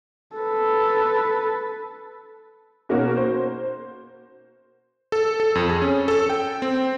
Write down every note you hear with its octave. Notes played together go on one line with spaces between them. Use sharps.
A4 B4
B2 A#3 C#4 D#4 F#4 A#4
C5
A4
A4
F2
G#4
C#4
A4
G5
C4